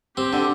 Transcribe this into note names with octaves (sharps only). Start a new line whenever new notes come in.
C4 G4
D3